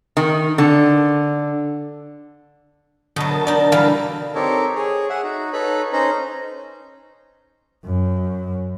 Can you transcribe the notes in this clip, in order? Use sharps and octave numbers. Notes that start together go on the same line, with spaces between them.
D#3
D3
B2 D3 F#3 A5 D#6
A#4 A5
D4 D#4 D5
D3 E3 G3 F5
C4 D#4 G4 A4 A#4 C#5
G#4 C#5
G#4 E5 F#5
D#4 F#4
D#4 A4 B4 C#5 B5
C#4 D#4 C5 A#5
F#2